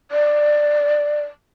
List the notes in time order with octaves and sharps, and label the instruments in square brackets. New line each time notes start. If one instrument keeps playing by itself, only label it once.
[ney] D5